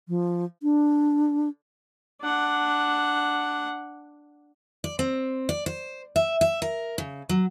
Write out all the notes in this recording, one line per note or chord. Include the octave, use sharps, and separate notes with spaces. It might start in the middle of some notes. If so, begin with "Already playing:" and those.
F3
D4
D4 F#5
D5
C4
D5
C5
E5
E5
A#4
C#3
F#3